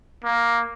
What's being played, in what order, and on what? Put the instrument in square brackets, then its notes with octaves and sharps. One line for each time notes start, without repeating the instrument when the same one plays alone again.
[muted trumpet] A#3